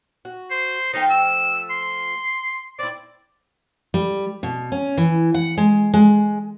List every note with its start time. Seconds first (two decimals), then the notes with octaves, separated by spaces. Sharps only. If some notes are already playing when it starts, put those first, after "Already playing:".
0.25 F#4
0.51 C5
0.94 F3 A3 D#4 G5
1.10 E6
1.70 C6
2.79 C4 E4 D5
3.94 G3
4.43 B2
4.72 C#4
4.97 E3
5.34 F#5
5.57 G#3
5.94 G#3